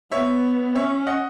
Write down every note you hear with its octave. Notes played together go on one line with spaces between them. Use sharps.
B3 C#5 E5
C#4 C#5 E5
D#5 F#5